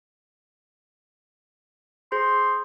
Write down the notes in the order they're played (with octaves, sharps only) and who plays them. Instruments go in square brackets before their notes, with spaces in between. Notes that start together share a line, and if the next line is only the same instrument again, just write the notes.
[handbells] G#4 C5 [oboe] C6